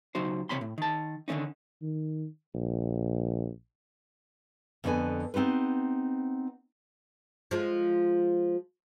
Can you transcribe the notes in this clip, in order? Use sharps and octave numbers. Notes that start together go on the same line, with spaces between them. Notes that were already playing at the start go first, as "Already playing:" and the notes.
C#2 F#3 D#4 F#4 C5
C2 C3 C4 C#5 B5 C6
A2
D#3 A5
D3 D#3 A3 C#4 D#4
D#3
A#1
F2 D3 A#3 B3 B4 G#5
B3 C4 D#4 G4 B4
F3 G#3